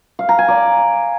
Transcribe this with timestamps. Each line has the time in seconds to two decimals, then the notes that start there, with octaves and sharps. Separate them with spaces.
0.19 F5
0.29 A#5
0.39 G#5
0.48 D5